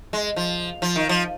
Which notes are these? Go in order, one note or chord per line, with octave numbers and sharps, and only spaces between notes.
G#3
F3
F3
D#3
F3